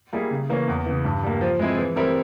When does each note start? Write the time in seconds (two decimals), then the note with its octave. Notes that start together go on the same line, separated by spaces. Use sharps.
0.13 G3 A#3 E4 G#4
0.31 C#3
0.49 E3 A#3 C#4
0.68 E2
0.86 C#3 E3
1.05 G2
1.23 G3 A#3
1.41 F3
1.59 G#3 C4 E4 G#4
1.78 E3
1.96 G3 C4 E4 A#4